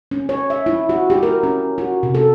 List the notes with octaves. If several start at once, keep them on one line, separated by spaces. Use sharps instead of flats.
C#4
C#5
E5
E4
F#4
G4
A#4
C#4
F#4
C3
A4